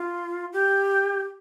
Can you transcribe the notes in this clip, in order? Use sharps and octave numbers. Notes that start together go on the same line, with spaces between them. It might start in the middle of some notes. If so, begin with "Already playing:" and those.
Already playing: F4
G4